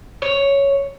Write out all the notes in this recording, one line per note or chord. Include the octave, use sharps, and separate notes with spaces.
C#5